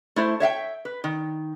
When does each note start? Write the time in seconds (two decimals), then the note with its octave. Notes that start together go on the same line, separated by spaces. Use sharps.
0.16 A3 E4 C5
0.40 C#5 E5 F5 G5
0.85 B4
1.04 D#3